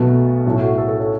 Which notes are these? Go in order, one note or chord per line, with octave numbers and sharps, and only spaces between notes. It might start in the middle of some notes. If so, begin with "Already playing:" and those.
Already playing: B1 B2 A3 B3
B1 A2 A3 C#4
F#4
F#4
A4
A4
C#5